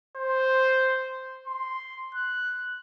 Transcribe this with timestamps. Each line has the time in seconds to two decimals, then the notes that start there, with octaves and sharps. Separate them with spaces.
0.17 C5
1.48 C6
2.15 F#6